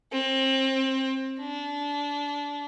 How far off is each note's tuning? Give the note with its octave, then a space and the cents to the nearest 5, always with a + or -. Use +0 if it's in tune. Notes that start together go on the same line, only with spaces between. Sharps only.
C4 +25
D4 -25